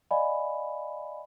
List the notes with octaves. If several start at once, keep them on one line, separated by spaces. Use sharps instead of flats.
D5 D#5 F5 G#5 B5